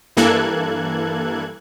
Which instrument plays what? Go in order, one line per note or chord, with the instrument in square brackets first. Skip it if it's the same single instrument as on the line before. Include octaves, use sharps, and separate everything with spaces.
[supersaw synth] G2 E3 A#3 A4 F#6 G#6